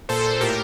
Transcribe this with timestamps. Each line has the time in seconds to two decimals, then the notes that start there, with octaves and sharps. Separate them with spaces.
0.09 A#2 A4 C5
0.25 A#2
0.41 A2 G4 A#4